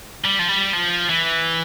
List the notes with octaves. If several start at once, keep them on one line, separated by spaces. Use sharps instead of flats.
G3
F3
G3
F3
E3